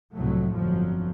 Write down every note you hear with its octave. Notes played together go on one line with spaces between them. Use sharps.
C2 F2 A2 F#3 A3
G1 F2 F3 F#3